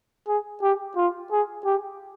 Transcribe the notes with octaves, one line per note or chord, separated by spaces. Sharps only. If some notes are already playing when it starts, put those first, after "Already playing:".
G#4
G4
F4
G#4
G4